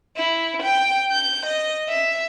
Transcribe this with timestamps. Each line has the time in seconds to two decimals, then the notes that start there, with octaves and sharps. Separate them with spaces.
0.17 E4
0.62 G5
1.11 G6
1.46 D#5
1.89 E5